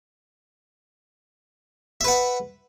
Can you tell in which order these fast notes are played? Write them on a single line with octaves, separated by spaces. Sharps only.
E5 B4 F#5